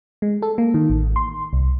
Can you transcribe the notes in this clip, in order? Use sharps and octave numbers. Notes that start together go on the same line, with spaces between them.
G#3
A4
A#3
D#3
A1
C6
C2